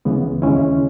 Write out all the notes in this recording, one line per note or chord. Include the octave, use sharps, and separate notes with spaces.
C#2 C#3 E3 G#3 B3
D#2 C#3 G#3 C#4 E4